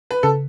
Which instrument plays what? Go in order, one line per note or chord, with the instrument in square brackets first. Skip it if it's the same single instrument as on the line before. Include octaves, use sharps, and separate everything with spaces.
[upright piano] B4
[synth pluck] C#3 [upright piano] A4